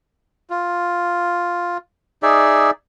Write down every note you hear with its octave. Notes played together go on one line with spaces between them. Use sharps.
F4
D#4 G#4 D5 E5